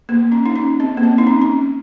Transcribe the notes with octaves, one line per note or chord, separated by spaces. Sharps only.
A#3
C#4
D#4
C#4
C4
A#3
C4
D#4
C#4
C#4